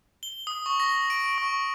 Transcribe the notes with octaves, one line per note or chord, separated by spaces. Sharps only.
G7
D#6
C#6
A#6
D7
C#6